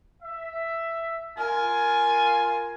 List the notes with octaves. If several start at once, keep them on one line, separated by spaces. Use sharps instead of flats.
E5
F4 A#4 G#5